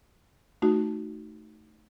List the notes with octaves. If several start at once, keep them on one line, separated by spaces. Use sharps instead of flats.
A3 D#4 F#4